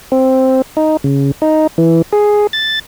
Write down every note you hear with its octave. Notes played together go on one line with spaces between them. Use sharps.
C4
D#4
C#3
D#4
E3
G#4
A6